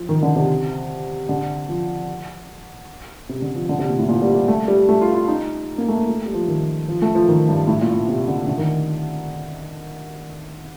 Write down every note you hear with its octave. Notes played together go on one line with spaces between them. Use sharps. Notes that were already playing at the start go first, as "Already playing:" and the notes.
Already playing: F3
D#3
D3
C3
D3
F3
C3
D3
F3
D3
C3
A#2
A2
A#2
G3
G3
A3
G3
A3
F4
F4
D#4
A#3
A3
A#3
A3
G3
F3
D#3
F3
A3
F3
D#3
G2
A2
A#2
A#2
C3
D3
D3
D#3